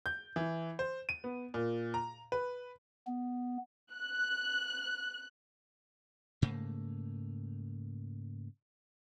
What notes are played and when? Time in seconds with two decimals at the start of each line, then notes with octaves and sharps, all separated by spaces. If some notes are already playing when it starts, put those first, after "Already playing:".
0.06 G6
0.36 E3
0.79 C5
1.09 D#7
1.24 B3
1.54 A#2
1.94 A#5
2.32 B4
3.07 B3
3.94 F#6
6.42 G#2 C#3 A3 A#3